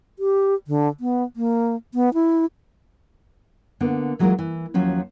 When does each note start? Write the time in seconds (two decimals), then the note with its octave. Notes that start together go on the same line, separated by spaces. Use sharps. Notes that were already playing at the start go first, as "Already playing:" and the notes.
0.19 G4
0.67 D3
1.00 B3
1.36 A#3
1.94 B3
2.14 E4
3.81 D3 A#3 B3
4.19 E3 F#3 G#3 E4 F4 A#4
4.39 E3
4.74 D#2 F3 F#3 C#4